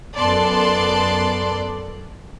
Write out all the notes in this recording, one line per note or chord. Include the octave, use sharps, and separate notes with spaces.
F#2 B3 A4 D5 A5 C6